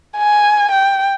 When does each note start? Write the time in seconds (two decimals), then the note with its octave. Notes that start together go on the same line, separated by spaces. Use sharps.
0.18 G#5
0.72 G5